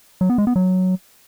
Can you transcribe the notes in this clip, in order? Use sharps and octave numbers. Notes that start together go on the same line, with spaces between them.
F#3
B3
G#3
B3
F#3